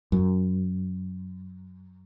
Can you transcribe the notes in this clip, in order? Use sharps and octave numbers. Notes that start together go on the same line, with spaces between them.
F#2